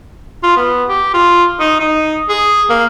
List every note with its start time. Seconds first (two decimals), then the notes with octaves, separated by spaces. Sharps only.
0.43 F4
0.56 B3
0.89 G4
1.14 F4
1.60 D#4
1.80 D#4
2.29 G#4
2.70 A#3